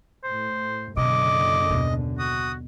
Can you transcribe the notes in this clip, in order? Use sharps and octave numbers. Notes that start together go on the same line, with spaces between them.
A2 C5
F#1 F#2 B2 D3 D#5 D6
D#2 B2
F#4 D#6